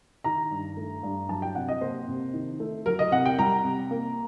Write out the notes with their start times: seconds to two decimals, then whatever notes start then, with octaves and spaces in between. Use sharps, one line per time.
0.24 D#3 A#5
0.51 G2
0.77 A3
1.03 G2
1.29 F#3 A5
1.42 G5
1.55 C3 F#5
1.68 D#5
1.81 A#3 C5
2.08 C3
2.33 D#3
2.60 A3
2.86 F#3 A#4
2.99 D#5
3.12 C3 F#5
3.26 G5
3.39 G3 A#5
3.64 C3
3.91 A#3